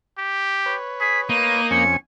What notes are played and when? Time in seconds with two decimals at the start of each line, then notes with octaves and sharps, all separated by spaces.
0.18 G4
0.66 B4 C#5
1.01 G#4 B6
1.30 A#3 D#4 D#7
1.71 F2 C#4 G#5 C#7